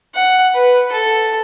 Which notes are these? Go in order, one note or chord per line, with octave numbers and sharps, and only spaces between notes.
F#5
B4
A4